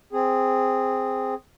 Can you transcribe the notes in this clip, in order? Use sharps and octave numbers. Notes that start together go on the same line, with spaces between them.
C4 G#4